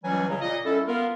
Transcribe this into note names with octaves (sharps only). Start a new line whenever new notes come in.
C#2 E3 F#3 G3 C#4 G#5
C#3 F#3
A#2 D#5
C2 C#4 E4 A4
B3 F4 A#4